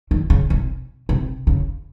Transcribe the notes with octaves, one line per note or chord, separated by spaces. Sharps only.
D#3
C#3
C3
C3
C#3